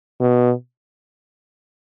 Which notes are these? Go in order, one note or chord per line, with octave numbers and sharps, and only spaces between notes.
B2